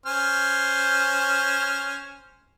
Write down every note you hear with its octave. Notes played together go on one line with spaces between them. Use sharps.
C#4 C5 F6